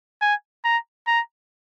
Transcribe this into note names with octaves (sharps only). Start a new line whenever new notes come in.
G#5
A#5
A#5